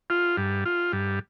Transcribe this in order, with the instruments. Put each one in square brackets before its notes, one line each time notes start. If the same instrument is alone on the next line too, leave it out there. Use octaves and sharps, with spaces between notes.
[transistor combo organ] F4
G2
F4
G2